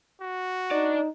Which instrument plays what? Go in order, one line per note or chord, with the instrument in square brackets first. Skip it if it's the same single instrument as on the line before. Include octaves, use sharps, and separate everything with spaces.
[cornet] F#4
[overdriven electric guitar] D4 D5 [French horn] D#4